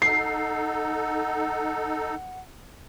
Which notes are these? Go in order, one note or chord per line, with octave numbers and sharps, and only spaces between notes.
D#4 A4 F#5 C7